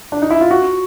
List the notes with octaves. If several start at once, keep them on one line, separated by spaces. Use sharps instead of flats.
D4
D#4
E4
F4
F#4